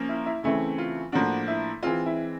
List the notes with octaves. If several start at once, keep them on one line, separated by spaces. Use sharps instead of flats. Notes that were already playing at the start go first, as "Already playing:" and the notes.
Already playing: F3 A#3 C#4
E4
E4
C#3 E3 A3 C4 E4
F4
A2 F3 A#3 D4 F#4
E4
E3 G#3 C4 F4
E4